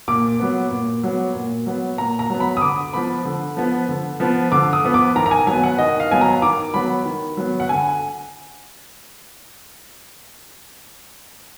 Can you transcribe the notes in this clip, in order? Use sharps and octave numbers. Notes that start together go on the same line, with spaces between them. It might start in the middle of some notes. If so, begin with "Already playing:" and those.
A#2 D6
F#3 B3
A#2
F#3 B3
A#2
F#3 B3
A#2 A#5
A#5
F#3 B3
B5
D#6
D3 D6
F3 B3 B5
D3
F3 B3
D3
F3 B3
D3 D6
D#6
F3 B3
D6
D#3 A#5
A#5
G#5
F#3 B3 G#5
F#5
D#3 D#5
F5
F#3 B3 G#5
A#5
D#3 D6
F#3 B3 B5
D#3
F#3 B3
F#5
D3 G#5